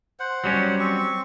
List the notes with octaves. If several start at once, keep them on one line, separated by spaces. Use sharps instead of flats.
C5 F#5
F#3 G3 C#4
C4 C#6